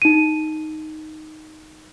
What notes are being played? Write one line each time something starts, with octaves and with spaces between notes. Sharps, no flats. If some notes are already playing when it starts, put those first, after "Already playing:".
D#4 D#7